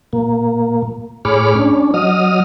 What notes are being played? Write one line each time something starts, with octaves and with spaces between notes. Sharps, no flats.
A#2 A#3
A2 G#4 C#5 B5 D6 F6
C#4 D4
F#3 D#5 D#6 F6